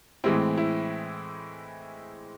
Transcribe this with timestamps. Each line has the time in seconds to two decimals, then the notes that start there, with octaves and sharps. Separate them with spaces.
0.24 A2 E3 G#3 C4 E4
0.57 E4